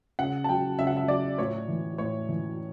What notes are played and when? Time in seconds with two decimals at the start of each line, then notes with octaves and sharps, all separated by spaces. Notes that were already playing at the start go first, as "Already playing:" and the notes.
0.19 C#3 F#5
0.44 A5
0.49 F#3 G5
0.79 C#3 E5
0.87 F#5
0.97 E5
1.08 F#3 D5
1.38 A2 C#5
1.68 E3
1.98 A2 C#5
2.29 E3